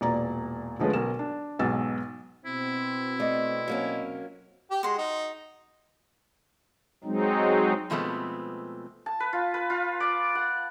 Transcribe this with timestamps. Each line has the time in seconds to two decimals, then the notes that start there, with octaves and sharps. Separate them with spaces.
0.01 E1 A#2 D5 A#5
0.79 D3 F3 G#3 A3 C#4 B4
0.93 B1 A#4 E7
1.19 D4
1.59 B1 G#2 B2 E6 A6
2.46 B2 C4 E4
3.20 A3 D5 D#5
3.68 F#3 A#3 C#4
4.70 G4
4.83 G#3 F#4 C6
4.98 D#4
7.04 F#3 G#3 C4 D#4
7.90 B2 F3 G#3 A3 B3 C4
9.06 A5
9.20 B4
9.33 F4
9.54 B4
9.70 F4
10.00 D5
10.35 F#5